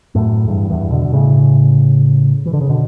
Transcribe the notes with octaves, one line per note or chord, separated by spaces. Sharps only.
F#2 A2
E2 G2
E2 G2
B2 D3
B2
A2 C#3
E3
D3
C#3
B2 D3